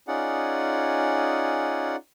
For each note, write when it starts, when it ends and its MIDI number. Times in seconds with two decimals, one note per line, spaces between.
0.08 1.96 61
0.08 1.96 63
0.08 1.96 65
0.08 1.96 68
0.08 1.96 74
0.08 1.96 78